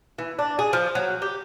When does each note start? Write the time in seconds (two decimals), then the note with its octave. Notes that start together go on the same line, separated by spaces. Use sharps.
0.18 E3
0.39 D4
0.59 G#4
0.73 F3
0.95 F#3
1.22 G4